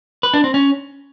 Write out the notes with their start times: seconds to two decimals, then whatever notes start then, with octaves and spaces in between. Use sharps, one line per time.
0.23 B4
0.34 D4
0.44 C4
0.54 C#4